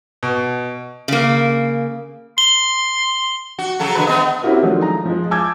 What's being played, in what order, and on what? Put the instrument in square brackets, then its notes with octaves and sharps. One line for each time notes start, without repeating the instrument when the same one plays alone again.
[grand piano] B2
[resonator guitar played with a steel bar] C#3 A#3
[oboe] C6 [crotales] G7
[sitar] F#4
C#3 F#3 A4
D3 F3 B4
B3 D#5
[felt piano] C4 C#4 E4 F#4 G4 A#4
D#3 F3 F#3 G#3 A3 D4
A#5
F3 G#3
G#5 A5 D6 E6 G6 G#6